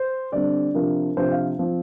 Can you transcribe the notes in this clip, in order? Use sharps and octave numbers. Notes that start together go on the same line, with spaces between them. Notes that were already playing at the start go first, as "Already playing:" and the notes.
Already playing: C5
D3 G3 C4 D5
C3 F3 D4 A#4
C3 F3 D4 C5
F5
F3 C4